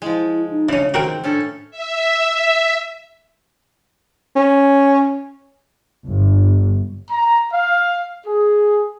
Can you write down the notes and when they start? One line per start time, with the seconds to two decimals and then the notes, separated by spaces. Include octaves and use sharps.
0.02 F3 G#3 E4
0.50 D#4
0.69 C#3 E3 C#4 D4
0.94 D#3 C4 F#4 A#4 G5
1.24 A2 C#4 D4 A4
1.71 E5
4.36 C#4
6.07 G1
7.10 A#5
7.53 F5
8.26 G#4